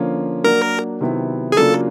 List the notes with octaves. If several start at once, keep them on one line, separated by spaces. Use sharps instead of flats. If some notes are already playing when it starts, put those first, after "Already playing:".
Already playing: D3 F3 A#3 C#4 F4
F#3 A#3 D4 F#4 A#4
C3 D#3 F#3 B3 E4
G#4
C#3 F#3 A#3 D4 F4 A4